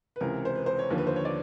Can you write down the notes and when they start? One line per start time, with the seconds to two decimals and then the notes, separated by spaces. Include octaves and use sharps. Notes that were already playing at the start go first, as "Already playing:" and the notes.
0.16 B4
0.21 C#2 C3 E3 A#4
0.45 C5
0.55 B4
0.66 C5
0.79 C#5
0.90 D#2 D3 F3
0.98 B4
1.07 C5
1.16 C#5
1.25 D5